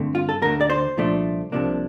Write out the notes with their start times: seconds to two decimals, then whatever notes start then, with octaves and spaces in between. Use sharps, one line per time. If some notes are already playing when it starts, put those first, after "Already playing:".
Already playing: G2 D3 A3 C4
0.15 F4
0.29 A4
0.42 D2 D3 A3 A#4
0.61 D5
0.70 C5
0.97 C2 A#2 F3 A3 D4
1.52 C2 C3 F3 A#3 D4